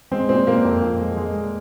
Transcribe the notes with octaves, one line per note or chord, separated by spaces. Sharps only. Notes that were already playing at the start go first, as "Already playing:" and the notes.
G#3 C4
A#2 C4
A#2 A#3
F2
F2
G#3
G#3
A#2